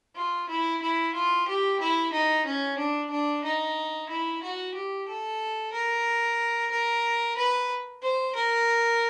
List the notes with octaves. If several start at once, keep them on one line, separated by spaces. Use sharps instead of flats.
F4
E4
E4
F4
G4
E4
D#4
C#4
D4
D4
D#4
E4
F#4
G4
A4
A#4
A#4
B4
C5
A#4